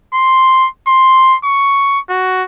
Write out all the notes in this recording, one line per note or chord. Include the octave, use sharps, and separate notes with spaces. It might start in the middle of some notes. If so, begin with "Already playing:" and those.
C6
C6
C#6
F#4